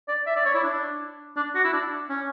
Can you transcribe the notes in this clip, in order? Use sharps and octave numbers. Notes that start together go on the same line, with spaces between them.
D5
E5
D5
C#5
E4
D4
D4
F#4
E4
D4
C#4